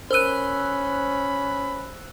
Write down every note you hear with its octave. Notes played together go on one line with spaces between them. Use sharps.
C#4 A#4 C5 B5 E6 F#6 D#7